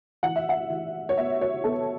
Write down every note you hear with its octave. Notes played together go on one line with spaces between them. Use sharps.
E3 F#5
E5
F#5
E3
C#5
B3 E5
C#5
B3 A4